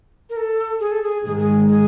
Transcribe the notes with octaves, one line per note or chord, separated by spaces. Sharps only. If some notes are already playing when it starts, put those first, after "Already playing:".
A#4
A4
G#4
A4
G#4
G#2 D#3 G#3 G#4
G#4
G#4